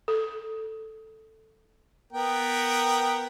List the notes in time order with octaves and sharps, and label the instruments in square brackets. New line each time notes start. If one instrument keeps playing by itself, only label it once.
[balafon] A4
[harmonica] B3 A#4 G5